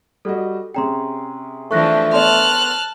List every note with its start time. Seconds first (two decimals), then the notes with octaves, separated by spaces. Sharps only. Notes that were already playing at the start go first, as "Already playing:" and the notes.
0.25 G3 F#4 A4 D#5
0.74 C3 C#4 G#4 G5 A#5 C6
1.71 E3 F3 A3 D4 C#6 F#6 A#6
2.13 B3 A4 C#5 A5 C6 F6 F#6